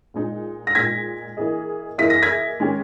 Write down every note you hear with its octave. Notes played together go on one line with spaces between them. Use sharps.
A#2 G#3 D#4
A#6
A#2 G#3 D#4 G#6 B6
E3 A#3 E4 G#4 D#5
E3 A#3 E4 G#4 D#5 B6
A#6
G#6 B6
D#3 G#3 C#4 G4